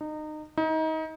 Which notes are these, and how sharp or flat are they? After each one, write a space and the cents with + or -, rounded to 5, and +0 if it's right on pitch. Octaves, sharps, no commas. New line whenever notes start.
D#4 -25
D#4 +30